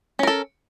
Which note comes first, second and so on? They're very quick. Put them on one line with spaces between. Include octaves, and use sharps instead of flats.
C#4 A#4 A4